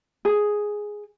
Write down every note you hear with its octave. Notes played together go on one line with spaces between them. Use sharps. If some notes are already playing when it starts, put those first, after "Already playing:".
G#4